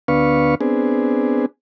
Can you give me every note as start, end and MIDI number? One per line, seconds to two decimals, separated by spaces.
0.08 0.55 38
0.08 0.55 59
0.08 0.55 62
0.08 0.55 71
0.08 0.55 77
0.08 0.55 85
0.61 1.46 59
0.61 1.46 60
0.61 1.46 62
0.61 1.46 68